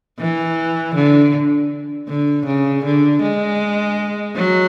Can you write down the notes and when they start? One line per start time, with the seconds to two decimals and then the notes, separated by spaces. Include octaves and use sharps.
0.19 E3
0.95 D3
2.08 D3
2.46 C#3
2.84 D3
3.22 G#3
4.35 F#3